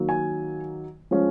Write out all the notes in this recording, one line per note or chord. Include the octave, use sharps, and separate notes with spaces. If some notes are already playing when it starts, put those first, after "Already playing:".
Already playing: D#3 F#3 A#3
G#5
F3 G#3 C#4